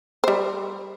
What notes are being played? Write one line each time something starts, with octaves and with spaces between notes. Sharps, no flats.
G3 C5